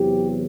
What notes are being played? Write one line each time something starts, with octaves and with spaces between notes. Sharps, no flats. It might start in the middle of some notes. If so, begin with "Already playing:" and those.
Already playing: E2 C3 F#3 G4